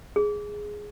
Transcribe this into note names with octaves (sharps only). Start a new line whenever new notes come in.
G#4